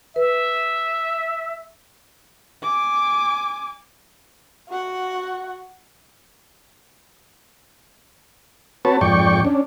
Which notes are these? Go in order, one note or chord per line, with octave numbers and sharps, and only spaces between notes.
B4 E5
G#5 D6
F#4 F#5
C4 F#4 B4 C#5 A5
F2 G#2 D5 G5 C#6
C#4 D4